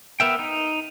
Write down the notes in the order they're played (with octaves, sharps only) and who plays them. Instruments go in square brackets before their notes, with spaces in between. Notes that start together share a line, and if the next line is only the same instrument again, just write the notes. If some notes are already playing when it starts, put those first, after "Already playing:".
[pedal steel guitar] B3 A#4 E5 G5
D#4